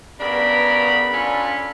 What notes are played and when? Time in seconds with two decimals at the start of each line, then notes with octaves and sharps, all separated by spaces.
0.20 G2 C#3 B3 D4 A#4 B5
1.14 C#4 D4 F4 A4 B5